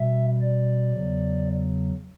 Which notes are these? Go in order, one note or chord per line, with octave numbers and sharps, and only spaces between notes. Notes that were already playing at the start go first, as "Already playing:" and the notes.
Already playing: B2 G3 E5
D5
E2 C#3 F#3